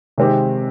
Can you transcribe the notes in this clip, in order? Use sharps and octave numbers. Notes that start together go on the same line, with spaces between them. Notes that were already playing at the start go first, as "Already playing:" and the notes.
C3 D#3 G#3 C4 G4